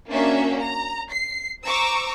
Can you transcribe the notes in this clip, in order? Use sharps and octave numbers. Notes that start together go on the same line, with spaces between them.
A#3 C#4 D4 F#4 E5
A#5
C7
C5 A#5 C#6 D6 E6